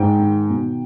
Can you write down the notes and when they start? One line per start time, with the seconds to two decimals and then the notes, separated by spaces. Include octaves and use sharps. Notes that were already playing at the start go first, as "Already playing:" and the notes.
Already playing: G#2 G5
0.19 D#3
0.50 B2